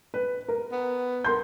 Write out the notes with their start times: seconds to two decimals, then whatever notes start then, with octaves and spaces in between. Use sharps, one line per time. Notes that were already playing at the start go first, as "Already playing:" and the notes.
0.14 B4
0.48 A#4
0.72 B3
1.24 A#4 C6 G6